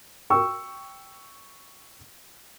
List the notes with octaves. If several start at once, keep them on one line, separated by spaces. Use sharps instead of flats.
G5 C#6 E6